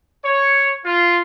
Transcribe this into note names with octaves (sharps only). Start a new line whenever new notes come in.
C#5
F4